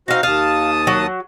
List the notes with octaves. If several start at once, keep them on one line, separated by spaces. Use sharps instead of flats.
C4 D#4 F#4 F5
D#2 F5 A5 D#6
F#3